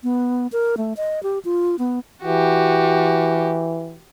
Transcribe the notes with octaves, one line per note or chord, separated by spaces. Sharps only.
B3
A#4
A3
D#5
G4
F4
B3
E3 F#4 G4